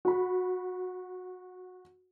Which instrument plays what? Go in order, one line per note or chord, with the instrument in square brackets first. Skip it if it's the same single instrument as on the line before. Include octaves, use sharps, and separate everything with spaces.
[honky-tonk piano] F#4 B5